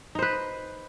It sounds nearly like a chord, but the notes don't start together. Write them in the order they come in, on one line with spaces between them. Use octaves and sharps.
D#4 C5 B4